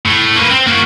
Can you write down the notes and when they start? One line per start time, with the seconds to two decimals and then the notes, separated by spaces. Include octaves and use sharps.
0.05 A2
0.36 A#3 B4
0.50 C4
0.67 A#3 F#4